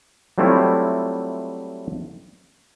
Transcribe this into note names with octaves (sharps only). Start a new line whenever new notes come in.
F#3 G3 A3 C4 E4 F4